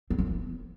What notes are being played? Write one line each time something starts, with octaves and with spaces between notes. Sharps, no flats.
C4
C#4
E3